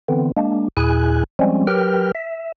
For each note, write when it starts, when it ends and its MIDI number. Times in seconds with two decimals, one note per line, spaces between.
0.08 0.32 50
0.08 0.32 52
0.08 0.32 59
0.08 0.32 60
0.37 0.68 56
0.37 0.68 58
0.37 0.68 62
0.77 1.24 39
0.77 1.24 46
0.77 1.24 64
0.77 1.24 68
0.77 1.24 80
0.77 1.24 90
1.39 1.67 53
1.39 1.67 55
1.39 1.67 56
1.39 1.67 60
1.39 1.67 61
1.67 2.12 54
1.67 2.12 67
1.67 2.12 70
1.67 2.12 71
1.67 2.12 79
1.67 2.12 89
2.15 2.52 76